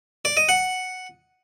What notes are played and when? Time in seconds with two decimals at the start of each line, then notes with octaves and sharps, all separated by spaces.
0.25 D5
0.37 D#5
0.49 F#5